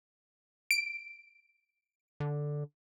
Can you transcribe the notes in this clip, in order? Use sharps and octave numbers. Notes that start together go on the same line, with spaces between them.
D7
D3